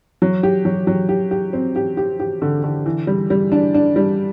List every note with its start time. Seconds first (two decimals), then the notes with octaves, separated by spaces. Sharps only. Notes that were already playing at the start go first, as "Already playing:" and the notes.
0.22 F#3
0.43 G4
0.65 F#3
0.87 F#3
1.09 G4
1.31 G4
1.53 C4
1.76 G4
1.97 G4
2.20 G4
2.42 D3
2.64 D3
2.86 E3
3.07 G3
3.30 G3
3.52 D4
3.74 D4
3.96 G3